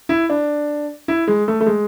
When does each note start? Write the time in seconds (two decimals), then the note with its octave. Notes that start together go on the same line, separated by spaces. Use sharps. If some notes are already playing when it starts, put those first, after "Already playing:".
0.09 E4
0.30 D4
1.08 E4
1.28 G#3
1.48 A3
1.61 A3
1.66 G#3